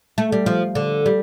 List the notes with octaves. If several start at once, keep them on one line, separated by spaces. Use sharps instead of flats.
A3
G3
F3
D3
G3